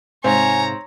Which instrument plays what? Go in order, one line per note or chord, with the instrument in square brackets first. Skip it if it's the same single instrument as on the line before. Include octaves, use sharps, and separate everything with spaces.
[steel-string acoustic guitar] G#2 C3 F5 [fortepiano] C4 [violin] C#5 A#5 [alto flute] G#5